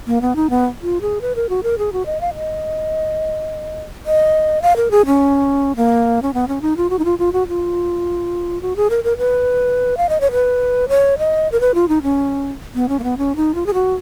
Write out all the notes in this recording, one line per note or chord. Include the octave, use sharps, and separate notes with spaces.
A#3
B3
D#4
B3
F4
G#4
B4
A#4
F#4
A#4
G#4
F#4
D#5
F5
D#5
D#5
F5
A#4
G#4
C#4
A#3
C#4
B3
C#4
D#4
F4
F#4
D#4
F4
F4
F#4
F4
F#4
G#4
A#4
A#4
B4
F5
D#5
C#5
B4
C#5
D#5
A#4
B4
F4
D#4
C#4
B3
C#4
A#3
B3
C#4
D#4
F4
G#4
F#4